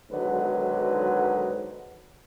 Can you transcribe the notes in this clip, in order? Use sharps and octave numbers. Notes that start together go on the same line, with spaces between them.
B1 G#2 D3 D#3 F#3 B4